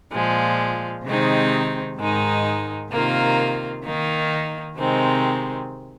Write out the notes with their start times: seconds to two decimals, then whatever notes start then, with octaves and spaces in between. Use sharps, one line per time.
0.11 A#2 F3 G#3
1.05 C3 D#3 G#3 C4 D#4
1.99 G#2 D#3 G#3 D#4
2.92 C3 D#3 A#3 F4
3.85 D#3 A#3 D#4
4.78 C3 D#3 G#3 C4